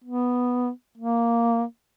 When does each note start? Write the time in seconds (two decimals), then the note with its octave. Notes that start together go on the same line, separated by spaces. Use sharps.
0.04 B3
0.98 A#3